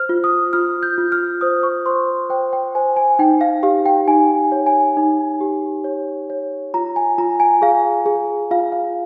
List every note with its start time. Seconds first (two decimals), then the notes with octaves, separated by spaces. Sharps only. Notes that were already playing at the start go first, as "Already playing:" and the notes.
Already playing: C5 F6
0.09 F4
0.24 D#6
0.53 F4 F6
0.83 G6
0.98 F4
1.12 F6
1.41 C5 D#6
1.63 C#6
1.86 C5 C6
2.30 C5 G5
2.53 G5
2.75 C5 G#5
2.96 G#5
3.19 D#4 G5
3.41 F5
3.63 G4 F5
3.86 G5
4.08 D#4 G#5
4.52 C#5
4.67 G#5
4.97 D#4
5.41 G4
5.84 C#5
6.30 C#5
6.74 F4 A#5
6.96 G#5
7.18 F4 A#5
7.40 G#5
7.62 G#4 F5
8.06 G#4
8.51 F4 F5
8.72 F5